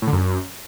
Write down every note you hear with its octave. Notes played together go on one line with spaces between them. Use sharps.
A2
D3
F#2